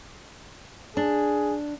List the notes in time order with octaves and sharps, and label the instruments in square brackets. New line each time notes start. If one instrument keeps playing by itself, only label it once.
[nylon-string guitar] D4 [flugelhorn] G#4